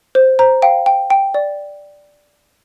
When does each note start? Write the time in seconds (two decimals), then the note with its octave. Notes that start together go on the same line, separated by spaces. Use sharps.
0.15 C5
0.39 C5 A#5
0.62 F5 G5
0.86 G5
1.10 G5
1.34 D5